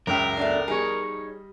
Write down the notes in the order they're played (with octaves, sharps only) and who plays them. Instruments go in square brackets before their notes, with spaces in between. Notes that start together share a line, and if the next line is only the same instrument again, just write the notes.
[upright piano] C#2 G5 F6 [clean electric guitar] F#2 E5 [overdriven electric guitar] A#4
[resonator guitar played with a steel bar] A3 B3 D4
[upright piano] G3 D#5 [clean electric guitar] D#4 C#5 [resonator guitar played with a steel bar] G#4